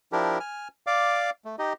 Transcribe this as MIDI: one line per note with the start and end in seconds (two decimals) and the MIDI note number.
0.12 0.39 53
0.12 0.39 62
0.12 0.39 64
0.12 0.39 67
0.12 0.39 70
0.40 0.68 80
0.40 0.68 89
0.87 1.30 74
0.87 1.30 77
0.87 1.30 86
1.45 1.56 57
1.59 1.73 63
1.59 1.73 67
1.59 1.73 75